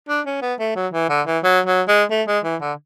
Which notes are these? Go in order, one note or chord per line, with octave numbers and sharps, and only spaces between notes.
D4
C#4
B3
A3
F#3
E3
D3
E3
F#3
F#3
G#3
A3
G#3
E3
D3